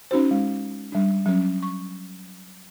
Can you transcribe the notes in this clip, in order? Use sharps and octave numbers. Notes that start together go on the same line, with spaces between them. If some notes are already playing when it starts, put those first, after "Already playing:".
C#4 D#4 F#4 C5
G#3
G3 D4
F#3 C#4
C#6